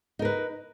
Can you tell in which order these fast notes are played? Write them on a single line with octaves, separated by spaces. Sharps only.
D#4 A#4 B4